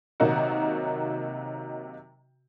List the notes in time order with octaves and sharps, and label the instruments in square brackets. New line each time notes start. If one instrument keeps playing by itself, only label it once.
[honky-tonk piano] C3 D#3 F#3 A#3 D#4 F#4